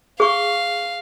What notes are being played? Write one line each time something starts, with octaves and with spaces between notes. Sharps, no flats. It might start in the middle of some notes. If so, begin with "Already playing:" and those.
G#4 F5 C#6